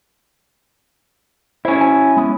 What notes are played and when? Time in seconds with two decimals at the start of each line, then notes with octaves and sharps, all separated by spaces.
1.65 C#4 E4 C5
1.81 G#5
2.17 G#3 B3